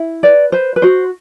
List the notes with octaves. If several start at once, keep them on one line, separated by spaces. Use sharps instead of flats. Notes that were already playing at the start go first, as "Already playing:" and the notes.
Already playing: E4
B4 D5
B4 C5
B4
F#4 C5